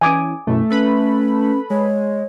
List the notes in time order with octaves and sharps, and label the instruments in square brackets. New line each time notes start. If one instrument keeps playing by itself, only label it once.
[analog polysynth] E3 C#4 [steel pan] G#5 D6 D#6
[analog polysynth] F#2 B2 E3 [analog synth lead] A3
[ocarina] C#4 [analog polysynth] A4 B4 B5
[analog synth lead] G#3 [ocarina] C#5